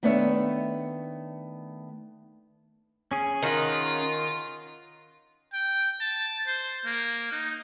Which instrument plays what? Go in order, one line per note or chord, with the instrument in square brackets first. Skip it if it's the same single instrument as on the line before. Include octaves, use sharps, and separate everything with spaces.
[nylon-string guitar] D#3 A3 B3 D4 C#5 E5
[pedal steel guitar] C#4 G#4
[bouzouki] D#3 F#5 [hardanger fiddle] F4
[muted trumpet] G5
A5
C5
A#3
D#4